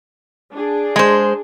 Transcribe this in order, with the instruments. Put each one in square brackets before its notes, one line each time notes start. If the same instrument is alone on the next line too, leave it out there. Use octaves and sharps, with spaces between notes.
[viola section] D4 G#4
[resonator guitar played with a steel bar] G#3 C5